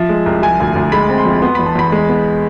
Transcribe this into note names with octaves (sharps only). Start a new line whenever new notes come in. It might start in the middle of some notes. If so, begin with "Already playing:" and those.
Already playing: F3 E5
G#3
C2
F3 G#5
D2
D2
G#3 B5
C4
C6
F2
B3 C6
E2 B5
A5
E2 B5
G#3
B3